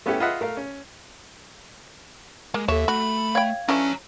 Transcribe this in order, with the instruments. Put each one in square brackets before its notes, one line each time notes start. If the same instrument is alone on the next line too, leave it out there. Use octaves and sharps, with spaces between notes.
[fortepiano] A3 B3 C#4 E4 G4 A4
F4 G#4 B4 D#5 E5 F#5
A3 A#4 F5
C#4
[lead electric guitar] G#3 [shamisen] A#3
[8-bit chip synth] D#2 [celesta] A4 E7 [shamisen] C#5 [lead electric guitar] E5
[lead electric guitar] A3 [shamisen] F#4 [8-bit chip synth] B5
[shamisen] C#5 G5 [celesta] F5 G#6
[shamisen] E3 A3 D4 [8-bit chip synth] C#4 [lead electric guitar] C#5 A#5